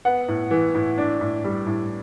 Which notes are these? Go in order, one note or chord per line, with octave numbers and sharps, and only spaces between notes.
B3 F#5
A2
E3
A2
D4
A2
G3
A2